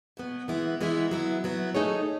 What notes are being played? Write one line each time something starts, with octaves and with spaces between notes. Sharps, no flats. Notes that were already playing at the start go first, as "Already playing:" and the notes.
B2 F#3 B3
E3 G#3 B3 E4
E3 G#3 B3 E4
F#3 B3 E4
F#3 B3 E4
A3 D#4 G#4 C#5